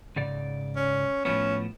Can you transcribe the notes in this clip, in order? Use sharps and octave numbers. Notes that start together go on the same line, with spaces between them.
G#2 C#3 D5
C#4
A2 F3 B3 C#4